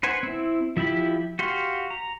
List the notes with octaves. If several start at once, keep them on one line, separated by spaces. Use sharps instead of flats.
B4 C5 F#5 G#5
C4 E4
F3 E4 G4 B5
F#4 G4 F5 C6
A#5